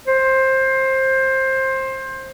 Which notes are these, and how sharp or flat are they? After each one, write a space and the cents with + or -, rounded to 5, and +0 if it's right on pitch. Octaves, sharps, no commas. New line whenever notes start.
C5 +20